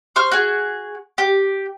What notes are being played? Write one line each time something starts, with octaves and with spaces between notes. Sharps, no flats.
C5 C#6 F6
F#4 G#4
G4